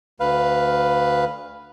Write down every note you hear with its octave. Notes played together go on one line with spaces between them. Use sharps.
D2 B4 F5